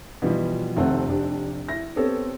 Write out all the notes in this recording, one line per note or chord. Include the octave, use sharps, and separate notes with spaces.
B2 E3 F3 G3
F1 D#2 A3 C4 F#5
F1 D4 G4
E4 A#6
B3 C4 G4 A4 C5 C#5